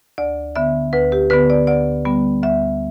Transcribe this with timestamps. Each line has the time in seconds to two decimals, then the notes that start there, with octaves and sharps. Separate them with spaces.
0.18 D2 D5
0.56 D3 B3 E5
0.93 D2 B4
1.12 G4
1.30 D3 B3 B4
1.50 D5
1.67 D2 D5
2.05 D3 G3 B3
2.43 D2 E5